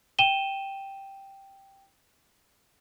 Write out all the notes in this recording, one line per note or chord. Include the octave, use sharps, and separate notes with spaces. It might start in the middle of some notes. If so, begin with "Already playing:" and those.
G5 D#7 E7 G7